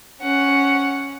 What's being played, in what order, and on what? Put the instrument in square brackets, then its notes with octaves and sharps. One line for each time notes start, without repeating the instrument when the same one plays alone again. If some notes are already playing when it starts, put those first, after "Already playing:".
[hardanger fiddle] C#4 F#5